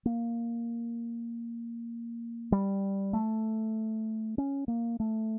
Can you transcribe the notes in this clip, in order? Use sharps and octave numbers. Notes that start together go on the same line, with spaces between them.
A#3
G3
A3
C#4
A#3
A3